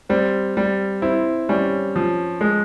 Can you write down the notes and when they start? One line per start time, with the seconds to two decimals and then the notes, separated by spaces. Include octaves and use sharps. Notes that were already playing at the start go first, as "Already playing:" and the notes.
0.09 G3 C4
0.57 G3
1.02 C4 E4
1.49 G3 C#4
1.96 F3
2.41 G#3